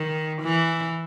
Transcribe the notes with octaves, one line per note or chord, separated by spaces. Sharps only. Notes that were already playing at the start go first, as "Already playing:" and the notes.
Already playing: D#3
E3